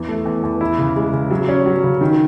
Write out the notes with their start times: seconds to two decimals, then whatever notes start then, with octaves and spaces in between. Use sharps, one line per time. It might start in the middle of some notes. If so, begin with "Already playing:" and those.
Already playing: E2
0.08 A3
0.26 E2
0.43 E2
0.61 E4
0.79 C#3
0.96 G#3
1.13 C#3
1.31 F#3
1.48 C#4
1.66 F#3
1.83 C#3
2.01 D#3